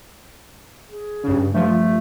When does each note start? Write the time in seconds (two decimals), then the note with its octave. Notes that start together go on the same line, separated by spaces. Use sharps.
0.89 G#4
1.24 G2 C#3
1.54 G2 F3 A3